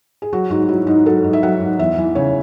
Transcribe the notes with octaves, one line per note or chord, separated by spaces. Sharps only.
G#4
F#3 F#4
G#2 F#4
F#3 E4
G#2 D#4
F#3 A4
G#2
E5
F#3 F#5
G#2
E2 E5
E3
C#3 C#5